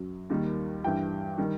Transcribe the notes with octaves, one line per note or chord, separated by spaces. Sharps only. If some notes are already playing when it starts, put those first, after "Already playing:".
Already playing: F#2 F#3
D#2 D#3 G3
G2 E3 G3 G5
D#3 G3